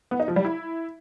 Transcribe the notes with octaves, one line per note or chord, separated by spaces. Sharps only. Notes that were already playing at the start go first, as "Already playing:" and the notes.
B3
D#4
F3
G3
E4